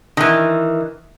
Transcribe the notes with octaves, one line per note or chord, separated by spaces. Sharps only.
D#3 E3